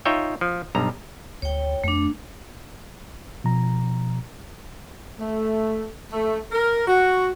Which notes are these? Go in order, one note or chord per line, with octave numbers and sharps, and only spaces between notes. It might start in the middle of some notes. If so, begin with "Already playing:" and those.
D#4 F4 C#5 E5 G5
F3
B1 G2 A#5
D2 C#5 G5
F2 A3 D4
B2 F3 A#5
A3
A3
A#4
F#4